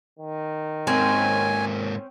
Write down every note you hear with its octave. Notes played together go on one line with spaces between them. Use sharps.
D#3
G#2 A#3 C4 C#4 G#5